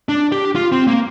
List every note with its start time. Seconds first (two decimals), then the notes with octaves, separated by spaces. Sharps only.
0.09 D4
0.32 G4
0.56 F4
0.72 C4
0.87 A#3